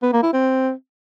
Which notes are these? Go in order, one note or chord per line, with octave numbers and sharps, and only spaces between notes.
B3
A#3
E4
C4